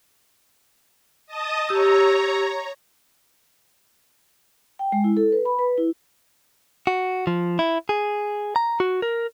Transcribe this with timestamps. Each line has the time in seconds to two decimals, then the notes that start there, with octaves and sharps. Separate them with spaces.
1.27 D#5 A5 D#6
1.69 G4 C#5 A#5 E6
4.79 G5
4.92 G#3
5.04 E4
5.17 A4
5.32 B4
5.45 B5
5.59 B4
5.78 E4
6.87 F#4
7.27 F3
7.59 E4
7.89 G#4
8.56 A#5
8.80 F#4
9.02 A#4